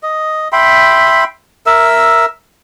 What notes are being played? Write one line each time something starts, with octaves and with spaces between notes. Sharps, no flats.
D#5
E5 G5 B5 C6
A#4 E5 E6